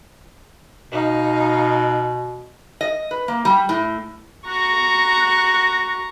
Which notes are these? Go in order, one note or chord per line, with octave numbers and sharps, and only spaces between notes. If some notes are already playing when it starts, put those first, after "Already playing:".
B2 D#4 F5
D#5
B4
A#3
G3
A2
F#4 A#5 C#6